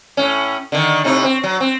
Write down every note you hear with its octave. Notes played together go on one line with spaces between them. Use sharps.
A2 C#4
D3 D#3
A2 C3 D#4
C4
F#3
C4